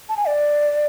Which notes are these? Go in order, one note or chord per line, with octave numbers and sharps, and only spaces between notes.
A5
G#5
D5